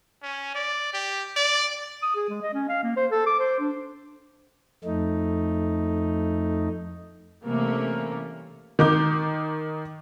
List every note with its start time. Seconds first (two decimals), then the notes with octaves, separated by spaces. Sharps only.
0.22 C#4
0.55 D5
0.93 G4
1.36 D5
2.02 D#6
2.15 G#4
2.29 G#3
2.42 D#5
2.54 C#4
2.69 F5
2.83 A#3
2.97 C5
3.11 A4
3.26 D6
3.39 C5
3.60 D4
4.84 F2 A3 D#4
7.44 C3 E3 G3 A3 A#3 C#4
8.79 D#3 D6 G6